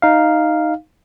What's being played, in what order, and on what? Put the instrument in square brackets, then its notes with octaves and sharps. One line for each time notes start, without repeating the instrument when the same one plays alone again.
[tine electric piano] D#4 F5